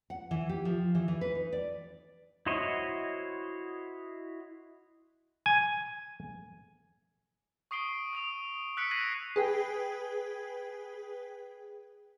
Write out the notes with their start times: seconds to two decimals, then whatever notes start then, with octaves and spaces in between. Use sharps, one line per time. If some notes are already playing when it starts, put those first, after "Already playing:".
0.10 F#5
0.31 E3
0.49 G4
0.65 F3
0.95 E3
1.08 E3
1.21 B4
1.35 D#4
1.53 D5
2.46 E4 F#4 C5 C#5 D#5
5.46 G#5
7.71 C#6 D#6 C7 D7 G7
8.13 D#6 D7 F7
8.77 E6 F#6 B6 C#7 D7
8.91 F#6 G#6 A#6 C7 D#7 F#7
9.36 G#4 B4 G5